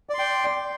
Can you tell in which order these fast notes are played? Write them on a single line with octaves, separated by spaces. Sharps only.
D5 C6 G5